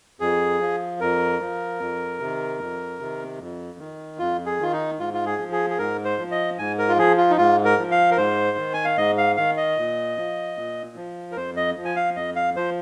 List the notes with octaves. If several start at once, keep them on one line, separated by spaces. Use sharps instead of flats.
F2 G#4
F3
F2 A#4
F3
F2
C3 D#3
F2
C3 D#3
F2
D#3
F2 F4
G#4
D#3 F4
D#4
G#2 F4
F4
G#4
F3
G#4
G#4
G#2 A#4
C5
F3
D#5
G#2 G#5
A#4
F4
F3 G#4
F4
D#4
G#2 F4
A#4
F3
F5
A#4
G#2 C5
D#3
G#5
F5
G#2 D#5
F5
D#3 F5
D#5
A#2
F3
A#2
F3
A#4
F2 C5
D#5
F3
G#5
F5
F2 D#5
F5
F3 C5